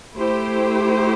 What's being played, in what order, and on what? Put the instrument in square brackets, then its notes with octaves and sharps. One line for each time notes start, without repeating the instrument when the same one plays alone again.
[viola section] A3 E4 G4 C5